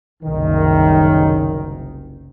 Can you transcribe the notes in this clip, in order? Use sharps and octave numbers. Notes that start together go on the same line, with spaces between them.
F#1 C2 D#3